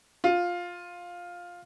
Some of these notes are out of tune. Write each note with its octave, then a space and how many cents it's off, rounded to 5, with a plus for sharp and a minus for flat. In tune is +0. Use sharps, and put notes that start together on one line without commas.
F4 +10